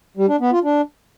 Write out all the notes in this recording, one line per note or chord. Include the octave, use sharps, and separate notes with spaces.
G3
D4
B3
F4
D4